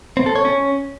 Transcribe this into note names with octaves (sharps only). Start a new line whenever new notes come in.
C4
A4
C#5
C#4